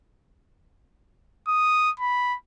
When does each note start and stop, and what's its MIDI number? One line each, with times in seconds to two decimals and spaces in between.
1.48 1.91 87
2.00 2.36 83